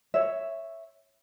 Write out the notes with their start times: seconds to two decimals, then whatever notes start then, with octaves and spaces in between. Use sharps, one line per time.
0.14 C#5 E5